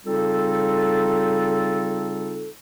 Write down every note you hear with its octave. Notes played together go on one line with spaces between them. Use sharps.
C#3 G3 C4 D#4 F4 A4